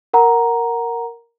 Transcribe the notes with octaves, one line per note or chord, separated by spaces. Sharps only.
A#4 F#5 A#5